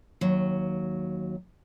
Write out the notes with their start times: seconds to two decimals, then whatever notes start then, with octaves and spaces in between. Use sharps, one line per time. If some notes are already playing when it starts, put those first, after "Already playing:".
0.21 D#2 F#3